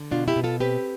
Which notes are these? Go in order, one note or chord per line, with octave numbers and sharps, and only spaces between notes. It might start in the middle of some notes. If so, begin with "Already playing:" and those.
Already playing: D3
B2 D4 F4
E4 G4
B2
F4 A4
C4 G4 B4